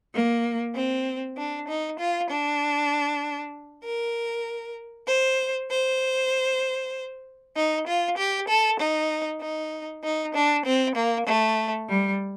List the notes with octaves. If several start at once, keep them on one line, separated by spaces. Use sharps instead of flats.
A#3
C4
D4
D#4
F4
D4
A#4
C5
C5
D#4
F4
G4
A4
D#4
D#4
D#4
D4
C4
A#3
A3
G3